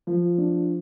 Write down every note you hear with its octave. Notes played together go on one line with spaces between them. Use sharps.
F3
D4